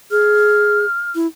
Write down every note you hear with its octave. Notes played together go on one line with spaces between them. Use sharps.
G#4 F6
E4